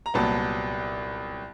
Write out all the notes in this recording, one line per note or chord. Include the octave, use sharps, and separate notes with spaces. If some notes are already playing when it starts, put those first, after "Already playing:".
A#5
C2 A#2 F#3 B3 A5